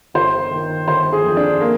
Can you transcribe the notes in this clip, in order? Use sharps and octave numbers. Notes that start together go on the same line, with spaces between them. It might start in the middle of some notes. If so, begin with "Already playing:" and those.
G1 C5
D#3
G1 C5
G#4
F2
D4
A#3